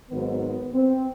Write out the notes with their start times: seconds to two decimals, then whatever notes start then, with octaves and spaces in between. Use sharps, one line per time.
0.11 G#1 G#2 D#3 F#3 B3
0.74 C4